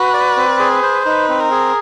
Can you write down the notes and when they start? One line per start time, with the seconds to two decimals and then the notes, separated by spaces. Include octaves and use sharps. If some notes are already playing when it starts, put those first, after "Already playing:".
Already playing: F#4 B4
0.13 D5
0.36 C4
0.59 G#4
0.82 C5
1.05 D#4 B4
1.29 C4
1.40 A#4
1.51 G#4